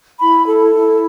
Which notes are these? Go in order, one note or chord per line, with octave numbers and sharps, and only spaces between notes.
E4 B5
A4
E4